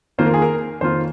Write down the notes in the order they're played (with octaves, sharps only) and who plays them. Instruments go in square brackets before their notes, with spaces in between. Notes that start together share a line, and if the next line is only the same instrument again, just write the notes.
[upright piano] F2 D#3 A#3 F4 [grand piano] C5
[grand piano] A#4
G#4
A#4
[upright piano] F2 D#3 A#3 F4 [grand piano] C5